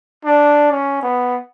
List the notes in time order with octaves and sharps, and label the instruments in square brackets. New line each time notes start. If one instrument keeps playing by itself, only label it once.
[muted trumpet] D4
C#4
B3